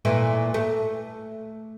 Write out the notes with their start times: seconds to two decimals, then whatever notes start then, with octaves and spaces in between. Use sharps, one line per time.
0.05 A#2 E3 A3
0.54 A3